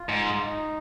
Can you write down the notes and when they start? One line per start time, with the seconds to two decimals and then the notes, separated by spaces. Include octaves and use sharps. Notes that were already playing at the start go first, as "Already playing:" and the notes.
Already playing: F4
0.09 G#2
0.41 D#4